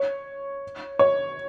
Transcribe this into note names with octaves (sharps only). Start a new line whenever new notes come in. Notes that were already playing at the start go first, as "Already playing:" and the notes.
Already playing: C#5
C#5